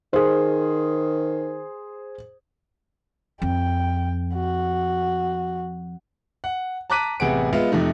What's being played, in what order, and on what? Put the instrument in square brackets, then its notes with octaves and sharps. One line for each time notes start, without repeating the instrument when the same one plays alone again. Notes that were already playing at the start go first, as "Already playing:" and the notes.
[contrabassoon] D#3 [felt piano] G#4 C5
[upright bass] F2 [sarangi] G5
[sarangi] F#4
[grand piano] F#5
A5 A#5 D6 F#6 B6 D#7
A1 C3 B3 G#4 F#5 D7
G#3 B3 F4 E5 F5
F2 C3 A3 D#4